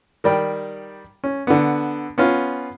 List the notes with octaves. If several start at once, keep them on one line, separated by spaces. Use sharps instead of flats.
D#3 G3 G5
C#4
D3 B3
B3 C#4 F4